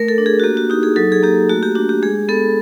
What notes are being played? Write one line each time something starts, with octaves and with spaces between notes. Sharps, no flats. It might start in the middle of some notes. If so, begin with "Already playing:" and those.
Already playing: A3 A#4
A4
D4
G#4
F#4
A#3 G4
F#4
D#4 G4
G#4
F#3 A4
G#4
A#3 G4
A3 F#4
G4
D4 F#4
G4
G#3 G#4
B3 A4